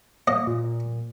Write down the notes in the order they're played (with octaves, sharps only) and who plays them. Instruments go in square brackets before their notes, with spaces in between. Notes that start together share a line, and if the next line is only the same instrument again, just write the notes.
[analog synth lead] A#3 [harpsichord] D#5
[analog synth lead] A#2